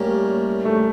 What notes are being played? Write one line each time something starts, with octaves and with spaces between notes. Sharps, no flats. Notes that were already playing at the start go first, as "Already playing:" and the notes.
Already playing: A2 G3 A#3 C#4
A3